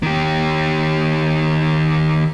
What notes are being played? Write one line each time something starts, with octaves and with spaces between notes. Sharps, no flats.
D#3 G4